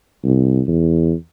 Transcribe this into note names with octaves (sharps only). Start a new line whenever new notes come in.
C2
E2